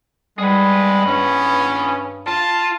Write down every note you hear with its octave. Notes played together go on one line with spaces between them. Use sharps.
G3 G#3 G#4 B4
G2 C#4
F4 A5